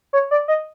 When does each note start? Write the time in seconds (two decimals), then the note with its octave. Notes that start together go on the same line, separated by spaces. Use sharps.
0.13 C#5
0.31 D5
0.48 D#5